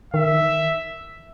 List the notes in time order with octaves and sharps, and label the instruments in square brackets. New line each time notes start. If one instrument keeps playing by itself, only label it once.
[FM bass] D#3 [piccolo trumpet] E5